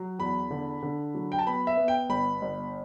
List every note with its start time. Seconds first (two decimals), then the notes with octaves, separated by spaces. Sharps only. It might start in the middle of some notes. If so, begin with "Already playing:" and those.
Already playing: F#3
0.19 E2 B5
0.51 D3
0.83 D3
1.15 F#3
1.32 G5
1.39 A5
1.47 B3 B5
1.67 E5
1.77 B3
1.88 G5
2.09 G1 B5
2.42 G1